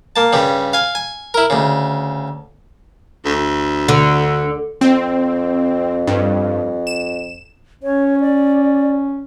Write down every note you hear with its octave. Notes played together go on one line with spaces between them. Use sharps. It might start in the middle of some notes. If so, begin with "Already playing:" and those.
A#3 A5
G2 C#3 G3
F5 G#5
G#5
E4 A#4
D2 C#3
D2
D3
F2 C4
G2
E7
C#4 C#5
D5